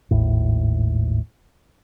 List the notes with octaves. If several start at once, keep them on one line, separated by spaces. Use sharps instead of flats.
G#1 D#2 A2